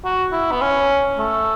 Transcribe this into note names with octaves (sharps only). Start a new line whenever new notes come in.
F#4
E4
B3
C#4
A3